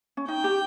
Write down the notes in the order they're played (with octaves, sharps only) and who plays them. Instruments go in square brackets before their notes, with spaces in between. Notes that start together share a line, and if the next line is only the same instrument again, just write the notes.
[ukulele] C#4
[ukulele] D#4 [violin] G5
[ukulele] G4